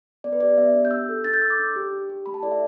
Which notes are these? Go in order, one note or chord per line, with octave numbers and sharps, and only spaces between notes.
B3 D5
B4
D4 G4 D5
B3 E5
D4 G4
G6
D4 E6
A4
D4 A6
G6
A4 E6
D6
D4
G4
D4
G4
A3 B5
A5
E4 A4 D5
E5